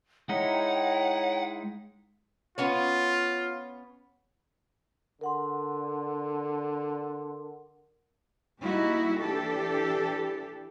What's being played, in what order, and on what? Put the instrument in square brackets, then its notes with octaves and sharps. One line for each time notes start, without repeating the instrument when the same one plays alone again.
[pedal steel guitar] G#3 D#4 E4 [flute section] C#5 G5 A#5 [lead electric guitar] F#5
[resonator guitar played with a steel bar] B3 C#4 C#5 [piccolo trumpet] F4
[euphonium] D3 [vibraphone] A#4 F#5 C6
[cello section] G3 A#3 D#4 E4 F#4
E3 D4 G4 A4